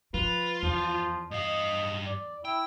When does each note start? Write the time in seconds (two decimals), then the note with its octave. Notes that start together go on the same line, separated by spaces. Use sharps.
0.14 F3 F4 B4
0.63 E2 F3
1.31 G2 D#5 F5
2.06 D5
2.45 E4 G5